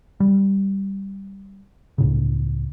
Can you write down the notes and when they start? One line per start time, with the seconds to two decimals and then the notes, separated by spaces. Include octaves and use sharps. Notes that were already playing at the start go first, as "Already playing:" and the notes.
0.20 G3
1.98 C#2 A2 C#3